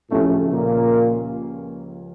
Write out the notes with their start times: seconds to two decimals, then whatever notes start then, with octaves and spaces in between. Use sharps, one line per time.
0.11 C#2 A2 C#3 F3 A3 C#4 G4
0.51 A#2 A#3